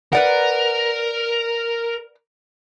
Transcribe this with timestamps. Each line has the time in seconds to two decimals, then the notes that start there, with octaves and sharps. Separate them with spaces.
0.13 A#4 B4 D5 F#5